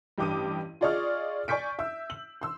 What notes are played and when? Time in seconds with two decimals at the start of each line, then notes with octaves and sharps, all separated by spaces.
0.18 A1 G2 G5 D6 D#6 D#7
0.81 F4 G#4 D5 D#5 C#6 F6
1.48 D5 G#5 C#6 G6 B6 D7
1.79 E5 E6
2.10 F#7
2.41 C6 E6